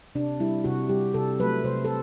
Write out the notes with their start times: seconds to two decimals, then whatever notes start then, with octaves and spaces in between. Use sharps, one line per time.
0.15 C3 D4
0.40 G3 E4
0.64 C3 F#4
0.89 G3 G4
1.14 C3 A4
1.40 F#3 B4
1.43 A3
1.64 C3 C5
1.85 A4